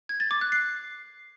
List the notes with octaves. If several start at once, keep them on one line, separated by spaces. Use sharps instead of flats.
G#6
A6
D6
F#6
C7